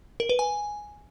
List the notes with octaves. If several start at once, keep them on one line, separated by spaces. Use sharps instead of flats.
A#4
B4
G#5